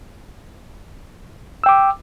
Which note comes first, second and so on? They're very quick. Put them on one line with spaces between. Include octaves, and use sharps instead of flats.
E6 G5 D6